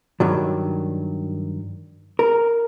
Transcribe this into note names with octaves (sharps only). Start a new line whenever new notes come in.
G2 D#3 F#3
A#4